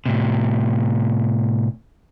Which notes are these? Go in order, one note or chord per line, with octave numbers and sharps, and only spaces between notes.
A2 C3